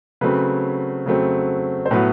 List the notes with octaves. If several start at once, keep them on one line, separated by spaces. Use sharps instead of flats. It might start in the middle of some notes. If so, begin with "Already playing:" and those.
C#3 F#3 A3 C4 B4
C#3 F#3 A3 C4
C5
A2 F#3 B3 B4